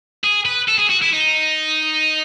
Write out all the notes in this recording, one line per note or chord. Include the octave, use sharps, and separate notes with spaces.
G#4
B4
A4
G#4
F#4
E4
D#4